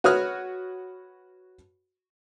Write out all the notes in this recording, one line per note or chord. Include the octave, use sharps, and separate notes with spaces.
F#4 B4 C#5 D#6 F6 F#6